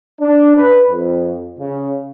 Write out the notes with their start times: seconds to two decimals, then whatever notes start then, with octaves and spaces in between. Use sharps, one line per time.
0.20 D4
0.57 B4
0.89 F2
1.59 C#3